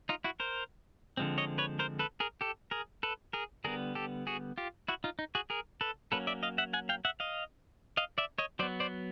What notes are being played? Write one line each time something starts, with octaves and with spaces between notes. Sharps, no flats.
D#4 F4
E4 F#4
A#4 C5
D3 F3 G#3 C4
C#5 D#5
B4 C#5
A#4 C5
A4 B4
G#4 A#4
G4 A4
G#4 A#4
A4 B4
G#4 A#4
D3 G3 B3 G#4 A#4
G4 A4
F#4 G#4
F4 G4
E4 F#4
D#4 F4
D#4
F#4 G#4
G#4 A#4
A4 B4
F#3 A#3 C#4 A4 B4
D5 E5
D#5 F5
E5 F#5
F#5 G#5
F5 G5
E5 F#5
D#5 F5
D#5 F5
D5 E5
C#5 D#5
F#3 B3 C5 D5
C5 D5